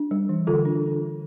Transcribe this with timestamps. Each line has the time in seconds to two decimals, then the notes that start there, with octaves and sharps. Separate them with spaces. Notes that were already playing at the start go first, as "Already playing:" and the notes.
Already playing: D4
0.11 G3
0.29 E3
0.47 D3 F4 A4
0.65 D4